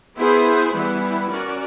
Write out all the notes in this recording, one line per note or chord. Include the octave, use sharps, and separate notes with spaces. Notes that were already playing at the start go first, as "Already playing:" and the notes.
B3 E4 G#4 C5
E3 G3 B3 E4
C#4 F#4 A#4 D5